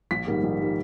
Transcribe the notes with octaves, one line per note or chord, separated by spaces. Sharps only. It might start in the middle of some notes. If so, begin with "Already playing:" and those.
A#1 B6
G#2 D#3 G3 A#3
A#1
D#3 G3 A#3